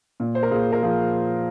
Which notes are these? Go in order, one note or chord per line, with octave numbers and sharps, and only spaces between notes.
A#2
C5
A#4
A#2 F4 G#4
A#4
F3 F4 G#4